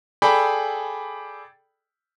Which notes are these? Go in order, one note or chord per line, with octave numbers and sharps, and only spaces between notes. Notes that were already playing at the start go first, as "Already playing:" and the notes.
G#4 A4 D5 G5 B5